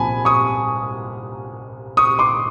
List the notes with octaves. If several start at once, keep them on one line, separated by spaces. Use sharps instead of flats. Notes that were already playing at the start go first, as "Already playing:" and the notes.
Already playing: C2 A#2 F3 G#5 A5 B5
C#6 D#6
C#6 D#6
C6 D6